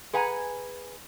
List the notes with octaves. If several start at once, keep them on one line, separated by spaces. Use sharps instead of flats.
G#4 B4 F#5 G#5 A#5